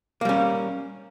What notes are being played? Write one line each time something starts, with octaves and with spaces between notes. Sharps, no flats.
G3 A#3 C#4